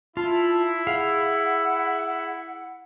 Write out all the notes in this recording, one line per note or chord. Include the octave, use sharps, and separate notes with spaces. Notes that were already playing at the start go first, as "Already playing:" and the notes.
E4 F4 A5
G#4 F5 F#5